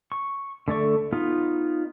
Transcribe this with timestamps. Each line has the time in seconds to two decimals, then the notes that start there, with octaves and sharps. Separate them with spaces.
0.12 C#6
0.68 D3 A3 D5 C#6
1.13 B3 D#4 F4